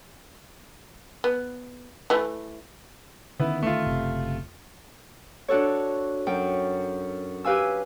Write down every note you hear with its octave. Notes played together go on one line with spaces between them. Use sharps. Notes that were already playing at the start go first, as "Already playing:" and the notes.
B3
E3 A3
D3 D#3 B3 C#4 E4 B4
A3 F4
F#1 C3
D4 F#4 A4 C#5
F#2 G5
G4 B4 F5 G#5 E6